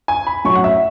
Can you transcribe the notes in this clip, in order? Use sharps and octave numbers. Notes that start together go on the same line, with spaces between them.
G#5
B5
B1 A2 F#3 C#4 C#6
F#5
E5